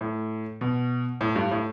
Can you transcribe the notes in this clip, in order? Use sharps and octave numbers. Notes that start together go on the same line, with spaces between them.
A2
B2
A2
G2
A2